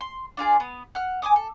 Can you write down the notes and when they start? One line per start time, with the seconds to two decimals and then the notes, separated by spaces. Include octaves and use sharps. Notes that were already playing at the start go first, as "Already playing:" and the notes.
0.01 C6
0.37 D4 F4 G#4 D5
0.60 B3 D#6
0.95 F#5 F6
1.22 G#5 C6 D6 D#6
1.36 A4